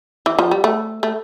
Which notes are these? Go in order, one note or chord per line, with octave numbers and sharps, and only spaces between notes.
E3
F3
G3
A3
A3